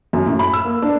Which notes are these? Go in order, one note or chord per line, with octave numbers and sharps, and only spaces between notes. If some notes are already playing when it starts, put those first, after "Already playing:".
F#2
A2
B5
E6
A#3
D4